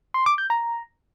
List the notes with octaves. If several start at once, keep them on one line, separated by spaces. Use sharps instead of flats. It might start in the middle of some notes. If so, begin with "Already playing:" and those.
C6
D6
G6
A#5